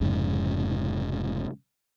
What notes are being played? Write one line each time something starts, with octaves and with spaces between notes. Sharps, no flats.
F1 F2 G#2 C#3